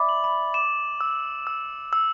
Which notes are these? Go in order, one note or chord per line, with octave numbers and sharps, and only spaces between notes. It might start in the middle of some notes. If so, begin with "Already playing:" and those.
Already playing: D5 E5 B5 D6 A6
F#7
B5
D6 E7
E6
E6
E6